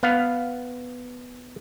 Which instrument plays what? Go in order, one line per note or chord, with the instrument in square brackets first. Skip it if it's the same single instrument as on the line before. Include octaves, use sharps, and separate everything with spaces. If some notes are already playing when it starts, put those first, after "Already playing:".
[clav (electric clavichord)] B3 F5